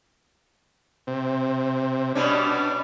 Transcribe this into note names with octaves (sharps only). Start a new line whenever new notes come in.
C3
B2 G3 C#4 D4